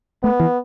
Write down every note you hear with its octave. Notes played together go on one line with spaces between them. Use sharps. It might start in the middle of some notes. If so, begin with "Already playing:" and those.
A3 B3
E3